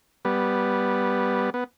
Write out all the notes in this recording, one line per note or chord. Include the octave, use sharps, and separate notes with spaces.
G3 B3
B3